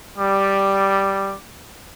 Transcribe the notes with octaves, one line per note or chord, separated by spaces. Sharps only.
G3 D6